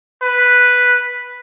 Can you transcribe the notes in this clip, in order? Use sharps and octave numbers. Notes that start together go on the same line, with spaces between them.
B4